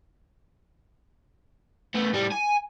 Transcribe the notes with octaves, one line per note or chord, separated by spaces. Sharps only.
A3 B3
A2 G3
G#5